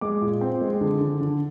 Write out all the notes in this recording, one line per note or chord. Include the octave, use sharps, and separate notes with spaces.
G#3 D6
A#2
C4
G#3
D3
D3
D3